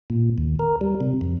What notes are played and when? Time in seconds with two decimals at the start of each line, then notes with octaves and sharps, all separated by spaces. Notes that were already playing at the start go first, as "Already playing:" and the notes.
0.10 A#2
0.38 D#2
0.59 A#4
0.81 G3
1.01 C3
1.21 F2